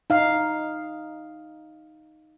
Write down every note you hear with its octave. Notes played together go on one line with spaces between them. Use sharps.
D#4 F5